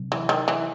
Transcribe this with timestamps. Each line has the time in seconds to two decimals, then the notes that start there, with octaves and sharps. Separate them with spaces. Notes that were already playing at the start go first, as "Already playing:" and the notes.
Already playing: C3 F#3 C4
0.12 E3
0.29 D#3
0.48 E3